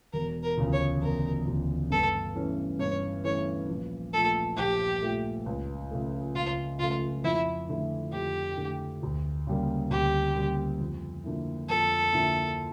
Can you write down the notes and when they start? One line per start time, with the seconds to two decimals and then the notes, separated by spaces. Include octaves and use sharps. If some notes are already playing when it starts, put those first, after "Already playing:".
0.13 E1 A#4
0.43 A#4
0.57 D2 C#3 F3
0.73 C#5
1.02 E1 A#4
1.47 D2 C#3 F3
1.90 G2 A4
2.35 E3 A3 C#4
2.79 G2 C#5
3.24 E3 A3 C#4 C#5
3.69 A#1
4.13 A#2 F3 A3 A4
4.57 A#1 G4
5.02 A#2 F3 A3
5.46 C#2
5.91 C#3 F3 A3
6.35 C#2 F4
6.79 C#3 F3 A3 F4
7.24 F2 E4
7.69 D3 A3 E4
8.13 F2 G4
8.57 D3 A3 E4
9.03 D2
9.47 C#3 G3 A#3
9.90 D2 G4
10.35 C#3 G3 A#3
10.80 F2
11.24 D3 F3 A#3 E4
11.69 F2 A4
12.13 D3 F3 A#3 E4